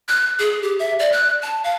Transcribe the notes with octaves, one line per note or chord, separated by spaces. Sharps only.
F#6
G#4
G4
E5
D5
F#6
A5
F5